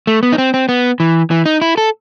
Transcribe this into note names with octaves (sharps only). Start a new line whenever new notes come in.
A3
B3
D#4
C4
C4
B3
E3
E3
D#4
E4
A4